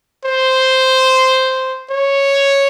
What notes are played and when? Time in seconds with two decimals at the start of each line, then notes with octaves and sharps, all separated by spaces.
0.26 C5
1.91 C#5